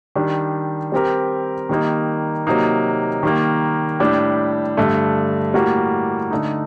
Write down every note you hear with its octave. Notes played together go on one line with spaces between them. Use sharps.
D#3 G3 D4
G3 C4 G4 A#4
D#3 G3 A#3 D#4
C3 F#3 A#3 D#4
D#3 G3 A#3
A2 G3 D4 G4
G2 D3 A3
A2 G3 A#3 F#4
D3 A3 D#4